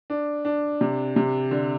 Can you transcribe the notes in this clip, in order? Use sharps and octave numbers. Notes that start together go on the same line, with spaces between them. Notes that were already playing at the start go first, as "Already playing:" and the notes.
D4
D4
C3
C3
D3